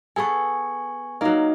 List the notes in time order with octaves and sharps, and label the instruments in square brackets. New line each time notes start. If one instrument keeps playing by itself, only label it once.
[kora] B3 G#4 A4 [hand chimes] G#5 C#6
[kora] F#3 A#3 [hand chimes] D#4 D#5